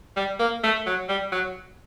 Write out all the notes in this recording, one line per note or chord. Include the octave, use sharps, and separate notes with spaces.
G3
A#3
A3
F#3
G3
F#3